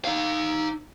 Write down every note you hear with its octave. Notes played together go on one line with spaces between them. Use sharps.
D#4 F5